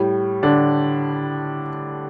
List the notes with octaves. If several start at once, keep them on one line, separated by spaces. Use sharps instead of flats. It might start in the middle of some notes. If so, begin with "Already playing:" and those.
Already playing: A2 G3
D3 D4